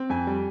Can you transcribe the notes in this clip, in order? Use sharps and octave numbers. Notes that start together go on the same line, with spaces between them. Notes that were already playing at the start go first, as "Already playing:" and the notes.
Already playing: C4
F2 G#5
G3